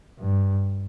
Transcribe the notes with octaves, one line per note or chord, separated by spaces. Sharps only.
G2